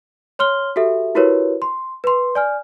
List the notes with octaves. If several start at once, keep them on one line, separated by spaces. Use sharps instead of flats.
C#5 C6 F6 G7
F#4 G4 A4 E5
E4 F#4 G4 A#4 B4 C#5
C6
B4 C6
D5 G#5 F6